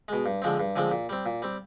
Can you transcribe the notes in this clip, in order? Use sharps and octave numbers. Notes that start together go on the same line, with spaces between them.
B2 G#3
G2
D3 F3 G#3 C4
G2
D3 F3 G#3 C4
A#2
G3 C4
A#2
G3 C4